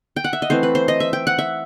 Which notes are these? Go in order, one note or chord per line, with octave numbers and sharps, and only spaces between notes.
G5
F#5
E5
D#5
E3 A3 C4 C5
B4
C5
D#5
E5
G5
F#5
E5